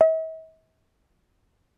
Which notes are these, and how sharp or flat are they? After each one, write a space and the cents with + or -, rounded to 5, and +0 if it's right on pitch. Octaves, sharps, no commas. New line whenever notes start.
E5 -45